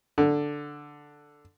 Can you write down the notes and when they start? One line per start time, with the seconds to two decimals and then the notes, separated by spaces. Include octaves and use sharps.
0.18 D3